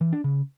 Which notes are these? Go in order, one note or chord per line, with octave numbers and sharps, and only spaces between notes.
E3
D4
C#3